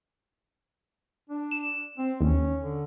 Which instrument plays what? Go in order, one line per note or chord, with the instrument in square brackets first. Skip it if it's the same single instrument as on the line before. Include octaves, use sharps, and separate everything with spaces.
[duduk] D4
[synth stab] E7
[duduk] C4
[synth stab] D#2 [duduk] C#4
[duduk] D3